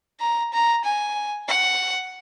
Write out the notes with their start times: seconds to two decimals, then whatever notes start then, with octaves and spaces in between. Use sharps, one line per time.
0.20 A#5
0.53 A#5
0.84 G#5
1.48 F#5